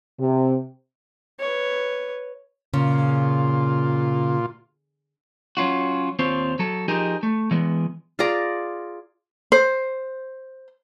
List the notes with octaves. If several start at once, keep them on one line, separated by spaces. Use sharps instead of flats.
C3
B4 C#5
A#2 C#3 F4
F#3 C#4 F4 F#4
D#2 C4 F4 C5 C#5
F#3 A4
F3 D#4 G4 G#4 A#4 D#5
A3
E3 G#3 B3
F4 G#4 D5 A#5
C5